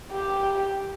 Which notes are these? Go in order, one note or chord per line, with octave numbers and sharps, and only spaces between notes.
G4